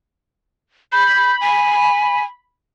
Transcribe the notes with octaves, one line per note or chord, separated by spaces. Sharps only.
B5 G6
G#5